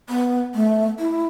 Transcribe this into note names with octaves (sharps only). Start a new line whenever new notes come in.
B3
A3
E4